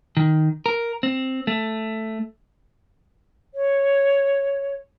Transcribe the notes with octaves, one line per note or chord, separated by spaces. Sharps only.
D#3
A#4
C4
A3
C#5